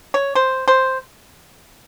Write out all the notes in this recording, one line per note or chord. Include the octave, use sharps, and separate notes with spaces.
C#5
C5
C5